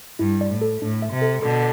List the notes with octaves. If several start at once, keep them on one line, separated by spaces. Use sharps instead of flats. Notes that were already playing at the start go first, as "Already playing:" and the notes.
G2 E4
D5
A2
A4
A2 D4
E5
C3
A4
B2 D3 A4